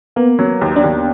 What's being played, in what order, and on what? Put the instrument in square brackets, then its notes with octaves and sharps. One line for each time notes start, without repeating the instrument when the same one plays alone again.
[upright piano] A#3 [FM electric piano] B3
[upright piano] F#3
D#2
[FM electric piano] D4
[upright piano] D#2